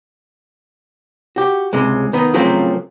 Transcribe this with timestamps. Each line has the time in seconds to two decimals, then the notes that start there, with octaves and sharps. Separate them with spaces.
1.36 F#4 G4
1.73 C#2 C3 G#3
2.13 D#3 B3 D#4
2.34 C#3 F3 F#3 A3 A#3 C4